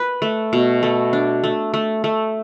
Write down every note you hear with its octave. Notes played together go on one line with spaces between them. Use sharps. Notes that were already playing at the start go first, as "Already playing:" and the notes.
Already playing: B4
A3
B2
A3
D4
A3
A3
A3